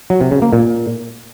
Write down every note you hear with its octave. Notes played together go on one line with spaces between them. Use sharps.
F#3
C3
C#3
A#3
A#2